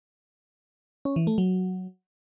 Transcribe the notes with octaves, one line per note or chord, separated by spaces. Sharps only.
C#4
E3
A3
F#3